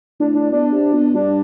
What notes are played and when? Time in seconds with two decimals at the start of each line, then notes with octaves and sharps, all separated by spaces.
0.20 A2 D4
0.35 D4
0.52 B2 D4
0.73 C3
0.93 B2
1.14 G2 D4